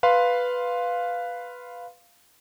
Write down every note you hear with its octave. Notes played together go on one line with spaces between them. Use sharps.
B4 F5 C6